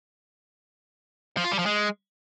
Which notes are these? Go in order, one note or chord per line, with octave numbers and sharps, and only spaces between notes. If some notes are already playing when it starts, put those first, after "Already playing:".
F3
F4
G3
F3
G#3